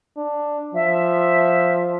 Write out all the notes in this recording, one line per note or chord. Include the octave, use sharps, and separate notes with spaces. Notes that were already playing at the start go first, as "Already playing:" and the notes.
D4
F3 E5